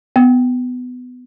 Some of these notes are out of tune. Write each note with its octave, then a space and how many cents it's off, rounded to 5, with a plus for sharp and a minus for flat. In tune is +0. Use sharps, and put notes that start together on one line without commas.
B3 +20